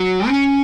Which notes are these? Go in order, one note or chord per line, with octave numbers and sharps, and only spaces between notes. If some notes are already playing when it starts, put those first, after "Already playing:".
Already playing: F#3
C#4